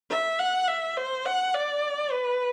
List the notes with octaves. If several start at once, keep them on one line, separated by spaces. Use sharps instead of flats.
E5
F#5
E5
C5
F#5
D5
B4